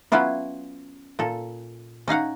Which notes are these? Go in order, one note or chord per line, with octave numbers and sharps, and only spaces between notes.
F#3 B3 C#4 E4 F4
A#2 A4
C#4 D#4 F5 F#5